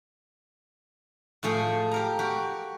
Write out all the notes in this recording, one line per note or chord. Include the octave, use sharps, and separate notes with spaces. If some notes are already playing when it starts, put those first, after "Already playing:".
A2 F3 A3 G#4
G4 A#4 A#5
F#4 G4